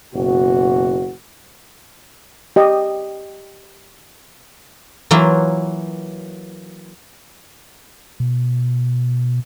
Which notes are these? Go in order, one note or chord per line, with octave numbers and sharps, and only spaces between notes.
F#1 B2 E3 F#4
G4 D#5
E3 F#3 A#3 E4 F4
B2